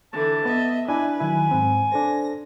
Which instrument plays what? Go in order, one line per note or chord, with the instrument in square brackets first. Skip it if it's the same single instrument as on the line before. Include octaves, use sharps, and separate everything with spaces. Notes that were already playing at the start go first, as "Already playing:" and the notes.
[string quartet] D3 E3 [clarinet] A5
[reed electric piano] B3 [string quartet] D#5 E5
[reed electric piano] D4 E4 [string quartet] B4 [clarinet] G#5
[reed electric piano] D#3 F#3 E4 [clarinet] G#5
[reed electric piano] G#2 C4
[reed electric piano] D4 A4 C5 [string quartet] A#6